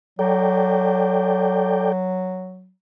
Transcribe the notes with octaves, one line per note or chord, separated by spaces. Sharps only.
F#3 A4 D5 G5